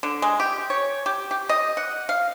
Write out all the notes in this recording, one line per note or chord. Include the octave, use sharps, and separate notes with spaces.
D3
G#3
G4
C#5
G4
G4
D#5
F#5
F5